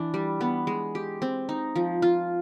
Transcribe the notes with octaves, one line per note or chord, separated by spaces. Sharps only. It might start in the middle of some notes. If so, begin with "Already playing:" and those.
Already playing: E3 D4
G3
B3
G#3
G4
C4
D#4
F3
F4